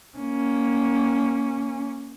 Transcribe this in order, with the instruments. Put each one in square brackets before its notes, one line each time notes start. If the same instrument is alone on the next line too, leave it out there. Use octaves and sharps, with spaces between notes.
[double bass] A#3 C#4